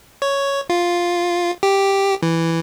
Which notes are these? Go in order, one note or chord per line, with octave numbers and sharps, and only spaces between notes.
C#5
F4
G4
E3